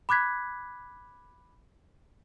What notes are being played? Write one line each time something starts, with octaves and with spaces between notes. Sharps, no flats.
B5 D6 F#6 G#6 B6